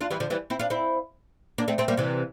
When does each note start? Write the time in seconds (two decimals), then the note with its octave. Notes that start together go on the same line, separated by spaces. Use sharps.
0.01 D4 F4
0.11 E3 G3
0.20 D3 F3
0.30 E3 G3
0.50 C4 E4
0.59 D4 F4
0.70 C4 E4
1.58 A#3 D4
1.68 A3 C4
1.78 A3 C4
1.88 G3 A#3
1.97 C3 E3